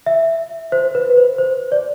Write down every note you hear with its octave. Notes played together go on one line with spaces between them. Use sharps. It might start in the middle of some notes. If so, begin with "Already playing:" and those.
E5
C5
B4
C5
C5
D5